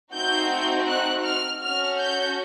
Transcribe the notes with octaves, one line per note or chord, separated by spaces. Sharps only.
A3 C4 D#4 F#4 G6
F#6
F6
C#4 F#4 A4 F6
G6